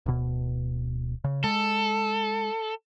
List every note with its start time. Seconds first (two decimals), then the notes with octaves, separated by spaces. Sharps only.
0.06 D1 B2
1.24 C#3
1.44 G#3 A4